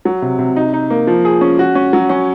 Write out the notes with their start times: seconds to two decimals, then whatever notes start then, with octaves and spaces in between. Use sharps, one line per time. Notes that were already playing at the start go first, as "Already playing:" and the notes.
0.05 F#3
0.22 C3
0.39 C3
0.56 D#4
0.73 D#4
0.90 A#3
1.07 F3
1.25 G#4
1.41 C#4
1.59 F#4
1.75 C#4
1.93 F#3
2.10 C#4